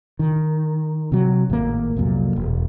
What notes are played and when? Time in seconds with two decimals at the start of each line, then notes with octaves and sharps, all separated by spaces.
0.19 D#3
1.12 C3 F#3
1.50 G#1 A2 C#3 A#3
1.96 C2 F2 A#2 F#3
2.36 E1